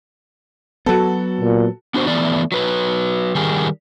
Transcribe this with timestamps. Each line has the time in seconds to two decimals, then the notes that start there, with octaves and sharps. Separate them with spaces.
0.86 F#3 B3 F#4 A4
1.41 A#2
1.94 B3 D4 F#4 B4 C5
2.07 E3 A3 B3 D5
2.52 F#3 B4
3.35 D#3 G3 G#4 A#4